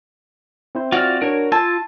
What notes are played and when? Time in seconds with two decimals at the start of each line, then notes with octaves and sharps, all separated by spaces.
0.75 C4 E4 C5
0.92 F4 F#4 D5 F6
1.22 D4 A#4 C#5
1.52 F4 A5 E6 G#6